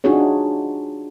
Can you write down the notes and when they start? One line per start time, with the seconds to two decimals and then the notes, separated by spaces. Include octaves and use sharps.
0.04 D4 D#4 F4 F#4 G#4 C#5